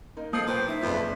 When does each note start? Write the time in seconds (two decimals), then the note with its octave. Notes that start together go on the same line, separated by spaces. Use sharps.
0.17 A#3 D#4
0.33 F3 A#3 A4 D#6 C7
0.47 B1 A#2 B4 C5 G5
0.68 D#4 E5
0.82 F#1 F2 F4 B4 D5